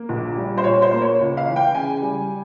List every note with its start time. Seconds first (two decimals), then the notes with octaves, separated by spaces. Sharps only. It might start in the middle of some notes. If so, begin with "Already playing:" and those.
Already playing: A#3
0.09 A#1
0.36 G3
0.58 C5
0.64 A#2 C#5
0.82 C5
0.91 A#3
1.02 C#5
1.19 C#2
1.37 F5
1.47 E3
1.56 G5
1.75 C#3 G#5
2.02 G3